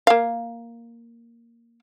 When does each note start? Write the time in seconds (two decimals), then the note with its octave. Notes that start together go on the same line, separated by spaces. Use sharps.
0.07 A#3 F5